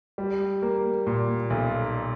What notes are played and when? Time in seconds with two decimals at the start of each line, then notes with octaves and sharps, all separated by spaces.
0.18 G3
0.62 A#3
1.07 A#2
1.50 B1